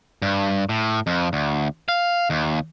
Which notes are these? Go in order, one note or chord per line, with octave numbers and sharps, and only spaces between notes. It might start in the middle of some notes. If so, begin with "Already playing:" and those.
G2
A2
F2
D2
F5
D#2